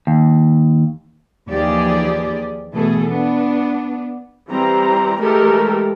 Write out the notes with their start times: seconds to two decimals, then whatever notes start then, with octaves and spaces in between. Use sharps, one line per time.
0.07 D#2
1.49 D#2 E3 F3 G4 G#4 D5
2.74 B2 E3 A3 G#4 A4
3.09 B3 D4
4.49 E3 G3 C4 A#5
5.20 E3 G#3 A3 G4 A4 A#4